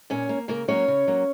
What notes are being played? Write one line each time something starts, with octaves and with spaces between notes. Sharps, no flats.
A#2 C#4 C#5
A#3
C#3 A#3 A#4
F#3 A#3 C#4 C#5
C#3
F#3 A#3